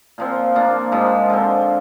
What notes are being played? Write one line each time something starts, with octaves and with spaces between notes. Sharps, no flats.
A#2 F3 C4
F3 A#3 D4 F4
G#2 F3 G#3
D3 F3 C4